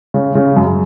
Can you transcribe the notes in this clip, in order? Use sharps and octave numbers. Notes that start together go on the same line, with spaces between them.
C#3
C#3
F#2